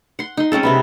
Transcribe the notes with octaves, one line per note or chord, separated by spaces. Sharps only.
F#5 C6
D#4 C6
G#3 C4 C#4 A4
C3 B3 B4